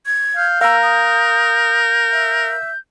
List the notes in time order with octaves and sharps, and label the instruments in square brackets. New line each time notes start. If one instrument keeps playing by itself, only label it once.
[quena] G#6
[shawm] F5 [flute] G6
[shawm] A#4 [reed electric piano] F5 A#5 [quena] E6
[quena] D#6
E5